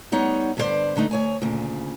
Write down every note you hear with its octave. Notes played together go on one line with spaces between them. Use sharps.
G3 B3 D#4 C#5 F#5
G2 D3 B3 F4 C5 D5
G2 D3 A3 D#4
D2 C#5 G#5
D2 A#2 C#3